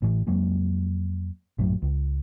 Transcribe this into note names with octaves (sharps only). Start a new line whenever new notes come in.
A1 A2 E3
F2 F#3 G#3 A#3
A#1 F#2 A2 F#3
C#2